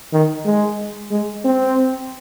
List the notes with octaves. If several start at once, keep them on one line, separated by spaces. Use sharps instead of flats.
D#3
G#3
G#3
C4